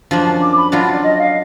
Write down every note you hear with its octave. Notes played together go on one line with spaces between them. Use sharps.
F#2 F3 A#3 D4
D6
B5
F#3 D4 F4 D5
D#5
F5